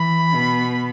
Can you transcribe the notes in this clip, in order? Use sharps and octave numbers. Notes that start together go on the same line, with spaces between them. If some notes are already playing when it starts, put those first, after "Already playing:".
Already playing: E3 B5
B2